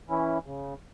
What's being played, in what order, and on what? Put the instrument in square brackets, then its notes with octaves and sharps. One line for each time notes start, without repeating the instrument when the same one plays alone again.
[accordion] E3 C#4 E4
C#3